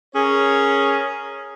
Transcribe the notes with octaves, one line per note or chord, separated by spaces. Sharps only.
C#4 G#4 A#4 C#5